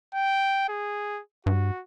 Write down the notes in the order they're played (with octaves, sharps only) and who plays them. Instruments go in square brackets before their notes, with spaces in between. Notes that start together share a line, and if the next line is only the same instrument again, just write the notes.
[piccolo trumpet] G5
G#4
[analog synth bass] G2 [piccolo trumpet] F#4